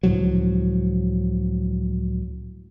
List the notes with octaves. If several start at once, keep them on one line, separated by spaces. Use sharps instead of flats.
C#2 A2 F3 F#3